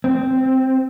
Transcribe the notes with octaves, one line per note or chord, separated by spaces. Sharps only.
C4